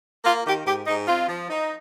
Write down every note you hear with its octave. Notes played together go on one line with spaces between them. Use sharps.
A#3 F4
D#3 G4
G#2 G4
G#2 D#4
C4 F4
F3
D#4